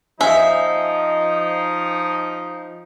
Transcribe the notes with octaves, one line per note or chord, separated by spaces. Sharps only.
F3 D#4 E5 G#5